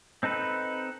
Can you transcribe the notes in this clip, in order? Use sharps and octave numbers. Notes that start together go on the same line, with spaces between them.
C4 D#4 A4 B4